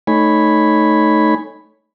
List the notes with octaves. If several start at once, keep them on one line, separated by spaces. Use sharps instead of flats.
A3 D#4 C#5 G#5 B5